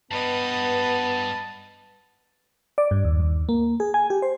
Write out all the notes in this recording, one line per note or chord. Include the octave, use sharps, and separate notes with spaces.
G2 G3 B3 B4 D#5 A5
D5
G2
D#2
D#2
A#3
G#4
G#5
G4
C5